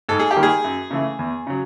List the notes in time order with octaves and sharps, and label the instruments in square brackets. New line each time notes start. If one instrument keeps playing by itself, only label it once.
[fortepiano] G#2 A4
G#4
G4
D#3 G3 A#3
G#4
F#2
C#3 E3 A3
E2
C#3 F#3